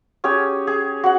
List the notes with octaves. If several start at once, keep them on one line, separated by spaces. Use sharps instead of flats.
C#4 G4 G#4 C#5
G#4
F#4 F#5